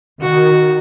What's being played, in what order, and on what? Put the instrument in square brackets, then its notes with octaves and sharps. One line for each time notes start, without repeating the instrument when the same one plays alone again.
[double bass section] D#3 [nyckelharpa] F#4